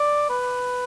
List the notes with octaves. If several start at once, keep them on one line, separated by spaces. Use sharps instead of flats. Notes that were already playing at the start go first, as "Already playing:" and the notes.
Already playing: D5
B4